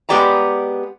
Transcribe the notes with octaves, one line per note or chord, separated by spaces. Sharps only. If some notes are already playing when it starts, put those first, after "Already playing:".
G#3 B3 G4 D5 G5 A#5